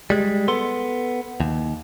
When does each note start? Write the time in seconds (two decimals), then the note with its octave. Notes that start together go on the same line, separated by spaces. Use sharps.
0.10 G3 G#3
0.48 B3 A4 C6
1.40 D#2